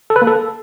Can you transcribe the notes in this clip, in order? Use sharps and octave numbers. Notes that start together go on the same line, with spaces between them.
A4
B4
A#3
A4